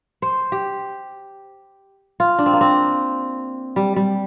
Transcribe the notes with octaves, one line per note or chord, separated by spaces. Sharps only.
C5
G4
F4
D4
C4
A#3
C4
G3
G3